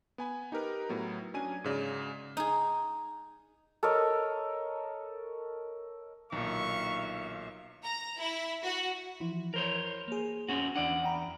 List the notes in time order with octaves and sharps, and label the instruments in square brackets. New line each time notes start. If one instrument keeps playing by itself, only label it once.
[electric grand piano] B3 G#5 B5
D#4 G4 A#4 B4
A2 F#3 B3
F#3 C#4 D4 G#5 G#6 D#7
G#2 C#3 D5
[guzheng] D#4 G#4
[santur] A4 A#4 C#5 D#5
[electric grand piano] B1 A#2 [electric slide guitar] D#3 D4 D#4 [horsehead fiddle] E5 F5 [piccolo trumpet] C#6
[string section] A#5
E4
F#4
[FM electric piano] E3 F3 E4
[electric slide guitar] A#4 C5 C#5
[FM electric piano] A#3 G#4
[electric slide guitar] C4 C#4 F#4
[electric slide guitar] E2 D5 F#5 [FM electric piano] D4
[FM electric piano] G5 A#5 B5